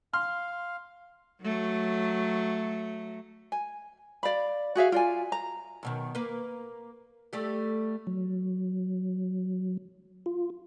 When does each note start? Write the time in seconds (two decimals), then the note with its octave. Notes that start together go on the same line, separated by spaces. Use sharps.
0.13 F5 C6 F6
1.42 F#3 A3
3.52 G#5
4.23 D5 F5 B5
4.75 F#4 G#4 E5 F5
4.92 F4 D5 G#5
5.32 A#5
5.83 F#2 B2 D#3
6.15 A#3 B4
7.33 G3 A3 G4
8.07 F#3
10.26 F4